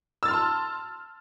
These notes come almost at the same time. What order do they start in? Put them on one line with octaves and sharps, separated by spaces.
E6 A6 F6 C6 A5